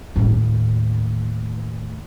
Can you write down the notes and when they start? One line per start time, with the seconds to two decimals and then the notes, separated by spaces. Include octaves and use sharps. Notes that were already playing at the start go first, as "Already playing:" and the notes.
0.16 D#2 A2